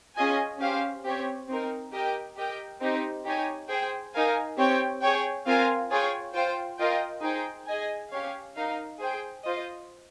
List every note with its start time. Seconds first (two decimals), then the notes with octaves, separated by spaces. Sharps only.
0.15 C#4 F4 G#4 D#5 G#5
0.60 C#4 G4 C5 F5
1.05 C4 G4 C#5
1.49 C4 D#4 A#4
1.93 G4 A#4 D#5 G5
2.36 G4 A#4 D#5 G5
2.81 C4 D#4 G4
3.26 D#4 G4 C#5 G#5
3.69 G#4 C5 G5
4.14 D#4 A#4 F5 G#5
4.58 C4 G4 C#5 G5
5.02 G#4 C#5 G5
5.46 C4 F4 A#4 F5 G#5
5.90 F4 G#4 C#5 G5
6.34 F4 C5 G5
6.78 F4 A#4 D#5 G5
7.22 D#4 G#4 C5 G5
7.67 G#4 D#5 G#5
8.11 C#4 G4 C#5 F5
8.55 D#4 A#4 F5
9.00 G#4 C5 G5
9.44 F4 C5 D#5